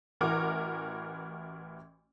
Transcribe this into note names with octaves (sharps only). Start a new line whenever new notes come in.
A1 E3 F#4 A#4 D6